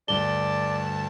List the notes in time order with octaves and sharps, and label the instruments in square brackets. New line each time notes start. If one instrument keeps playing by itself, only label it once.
[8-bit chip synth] D2 G2 A5 [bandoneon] D5 [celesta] G7